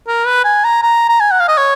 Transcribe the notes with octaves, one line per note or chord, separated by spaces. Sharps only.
A#4
B4
G#5
A#5
A#5
A#5
G#5
F#5
F5
D#5
C#5